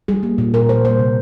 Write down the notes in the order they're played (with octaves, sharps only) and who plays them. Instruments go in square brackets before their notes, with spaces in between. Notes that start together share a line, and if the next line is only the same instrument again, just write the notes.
[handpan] G3 G#4
A#3
A#2
A#2 A#4
G3 C5
A#3 C5
C3